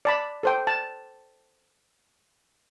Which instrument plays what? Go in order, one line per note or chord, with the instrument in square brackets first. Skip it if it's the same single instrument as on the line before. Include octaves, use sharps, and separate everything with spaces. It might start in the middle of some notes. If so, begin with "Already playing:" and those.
[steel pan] D5 A5 B5
A4 C5 G5
A5